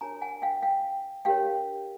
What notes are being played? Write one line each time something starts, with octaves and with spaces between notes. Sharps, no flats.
D4 F#4 A#4 C#5 G#5 A#5
F#5 G#5
F5 G5
F5 G5
D4 G4 A#4 C#5 F5 G5